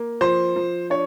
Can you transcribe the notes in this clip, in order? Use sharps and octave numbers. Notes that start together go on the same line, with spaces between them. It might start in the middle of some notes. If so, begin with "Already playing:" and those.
Already playing: A#3
F3 C5
F3
D4 C#5